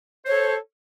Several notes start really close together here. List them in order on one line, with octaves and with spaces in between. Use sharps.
C5 C#5 A4